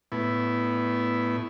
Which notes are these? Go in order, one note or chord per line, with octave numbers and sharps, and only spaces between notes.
A2 B3 E4